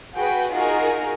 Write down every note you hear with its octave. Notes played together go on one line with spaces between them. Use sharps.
F#4 G#4 B4 G5
D#4 F4 F#4 G#4 A#4